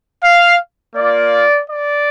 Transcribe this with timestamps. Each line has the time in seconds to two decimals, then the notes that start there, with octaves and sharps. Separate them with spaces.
0.24 F5
0.95 A#3 F4 D5
1.68 D5